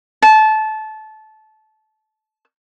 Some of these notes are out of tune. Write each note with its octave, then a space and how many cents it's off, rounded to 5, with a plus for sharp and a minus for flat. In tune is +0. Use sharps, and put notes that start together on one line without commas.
A5 -20